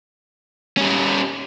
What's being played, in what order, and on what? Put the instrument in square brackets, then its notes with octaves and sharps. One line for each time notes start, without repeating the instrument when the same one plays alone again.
[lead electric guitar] G3 C#4